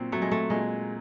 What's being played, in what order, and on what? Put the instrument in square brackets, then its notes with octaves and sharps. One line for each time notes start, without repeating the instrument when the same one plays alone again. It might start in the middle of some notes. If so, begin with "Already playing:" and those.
Already playing: [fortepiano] A#2 F#3 [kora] C4
[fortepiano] F#3 [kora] A3
[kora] G#3
A3
[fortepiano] A#2 [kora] G#3